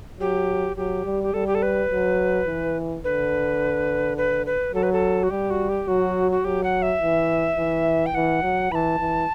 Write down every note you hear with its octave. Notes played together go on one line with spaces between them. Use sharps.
F#3 G4
F#3 G4
G3
G4
G3 A4
G4
A4
B4
F#3
E3
D3 B4
B4
B4
F#3 A4
B4
A4
F#4
G3 G4
F#4
G4
F#3 F#4
F#4
F#3 G4
F#5
E5
E3
E3
G5
E3 F#5
F#3
E3 A5 B5
E3